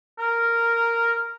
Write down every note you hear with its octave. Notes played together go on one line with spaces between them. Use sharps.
A#4